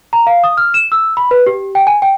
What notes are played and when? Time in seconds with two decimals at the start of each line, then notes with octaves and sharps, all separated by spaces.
0.13 A#5
0.27 F5
0.44 D#6
0.57 F6
0.74 E7
0.92 E6
1.17 B5
1.31 B4
1.47 G4
1.75 G5
1.87 G#5
2.02 G5